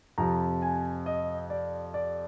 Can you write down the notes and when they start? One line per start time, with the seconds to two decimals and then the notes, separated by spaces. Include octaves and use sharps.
0.18 F2 C3 F3 A#5
0.62 G#5
1.06 D#5
1.50 D5
1.94 D5